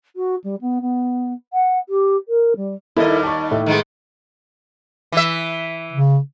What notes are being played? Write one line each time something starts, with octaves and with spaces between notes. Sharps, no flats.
F#4
G3
B3
B3
F#5
G4
A#4
G3
D#2 G3 E4 A4 A#4 D#5
A5 C#6
A2 E5
D#3 G#3 B3
E3 E5
C#3